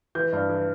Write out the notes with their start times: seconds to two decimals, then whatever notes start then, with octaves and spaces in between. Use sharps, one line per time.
0.15 E3 G6
0.33 G2
0.49 E3